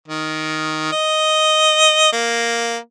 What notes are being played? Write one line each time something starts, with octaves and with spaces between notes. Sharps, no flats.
D#3
D#5
A#3